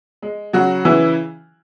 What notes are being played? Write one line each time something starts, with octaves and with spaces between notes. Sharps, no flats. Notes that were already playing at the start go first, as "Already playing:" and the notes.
G#3
C#3 F#3 F#4
C#3 E3 E4